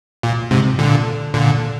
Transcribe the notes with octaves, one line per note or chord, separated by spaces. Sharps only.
A#2
G#2 C3
A#2 D3
A#2 D3